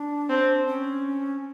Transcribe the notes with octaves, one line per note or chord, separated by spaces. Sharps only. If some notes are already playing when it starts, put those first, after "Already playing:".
Already playing: D4
C4
C#4